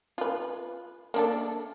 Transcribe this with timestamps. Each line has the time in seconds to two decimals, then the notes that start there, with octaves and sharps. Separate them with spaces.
0.18 F4 B4
1.14 A#3 D4 A4